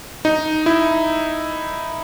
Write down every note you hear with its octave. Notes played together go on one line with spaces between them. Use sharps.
D#4
E4